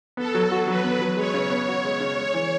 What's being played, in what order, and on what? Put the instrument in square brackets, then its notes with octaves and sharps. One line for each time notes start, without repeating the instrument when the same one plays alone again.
[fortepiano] B3 [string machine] A4
[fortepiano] F#3
F#4
[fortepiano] F#3 [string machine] B4
[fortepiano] B3
F#3
[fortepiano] G#3 [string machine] C#5
[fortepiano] C#3
B3
F#4
G#3
C#3
G#3
E3